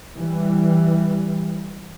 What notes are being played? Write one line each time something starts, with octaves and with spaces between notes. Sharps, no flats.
E3 G3